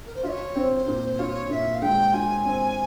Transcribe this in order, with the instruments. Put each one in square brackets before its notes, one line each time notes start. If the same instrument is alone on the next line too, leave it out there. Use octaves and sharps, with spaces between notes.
[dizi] A#4
C5
[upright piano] F4 [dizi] C#5 E5
[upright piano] C4
[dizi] C5
[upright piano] A#2
[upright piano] F4 [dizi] C#5
[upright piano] A#2 [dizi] E5
[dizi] F5
[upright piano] G#3 [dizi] G5
[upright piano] F4 [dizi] G#5
[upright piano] C4